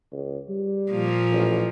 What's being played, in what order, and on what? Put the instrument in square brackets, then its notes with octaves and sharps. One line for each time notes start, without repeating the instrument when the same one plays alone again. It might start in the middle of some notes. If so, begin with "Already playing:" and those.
[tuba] C#2
G3
[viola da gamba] A#2 F3 A#3
[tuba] A1